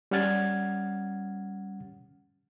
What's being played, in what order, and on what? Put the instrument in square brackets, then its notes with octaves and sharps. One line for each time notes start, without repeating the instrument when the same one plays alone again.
[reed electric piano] G3 C#4 F#5 F6 G#6 A6